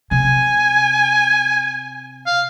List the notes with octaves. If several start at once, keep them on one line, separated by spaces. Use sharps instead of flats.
C3 G#5
F5